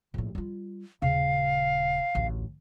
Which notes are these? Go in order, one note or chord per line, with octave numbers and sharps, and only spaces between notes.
A#1 A2
G3 F4
D#1 C#3 F5
A1 D2